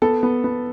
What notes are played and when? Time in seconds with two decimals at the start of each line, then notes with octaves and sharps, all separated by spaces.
0.02 B3 A4
0.23 B3
0.44 B3